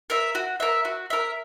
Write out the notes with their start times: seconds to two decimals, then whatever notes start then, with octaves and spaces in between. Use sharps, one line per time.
0.10 A#4 E5
0.35 F#4
0.60 A#4 E5
0.85 F#4
1.10 A#4 E5